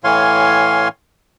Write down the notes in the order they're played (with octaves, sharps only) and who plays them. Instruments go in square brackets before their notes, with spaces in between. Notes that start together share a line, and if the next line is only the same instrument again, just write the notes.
[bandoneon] A2 E3 C#5 F5 G#5 C6